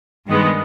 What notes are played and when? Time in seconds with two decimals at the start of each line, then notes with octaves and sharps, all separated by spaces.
0.28 G2 D#3 G#3 B3